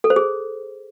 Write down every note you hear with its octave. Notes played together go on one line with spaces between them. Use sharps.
A4
C5
G#4